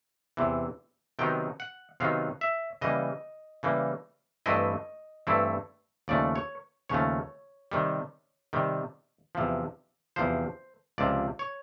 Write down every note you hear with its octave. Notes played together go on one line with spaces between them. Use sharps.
E2 C3 E3
C3 D#3 F#3 B3 D#4 G5
F#5
C3 D#3 F#3 B3 D#4 F5
E5
C#3 E3 G3 A#3 D#5
C#3 E3 G3 A#3
G2 E3 A3 C4 E4 D#5
G2 E3 A3 C4 E4
D#2 C#3 F3 A3 D5
C#5
D#2 C#3 F3 A3 C#5
C3 D#3 G3
C3 D#3 G3
E2 C3 F3
E2 C3 F3 C5
C#2 C3 F3 D5
C#5